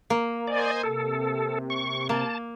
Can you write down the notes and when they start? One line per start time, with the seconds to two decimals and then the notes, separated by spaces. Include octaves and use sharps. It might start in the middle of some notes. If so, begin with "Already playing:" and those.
0.10 A#3
0.47 C5 D5 D#5 G#5
0.83 C3 A4
1.70 C#6
2.09 A#3 A5